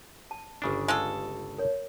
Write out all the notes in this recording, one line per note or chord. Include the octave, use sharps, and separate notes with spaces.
A5
G1 C#3 D4
G#3 F4 A4
A#4 C#5